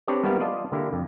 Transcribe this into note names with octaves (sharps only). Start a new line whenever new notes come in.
C4 D4 G4 B4 C#5 D5
G3 A#3 B3 E4 G4 A#4
F4 D5 D#5 A5
D3 A#3 E4 G4
F2